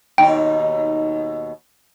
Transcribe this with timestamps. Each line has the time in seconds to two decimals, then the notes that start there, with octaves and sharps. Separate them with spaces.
0.18 D#2 B2 D#4 G5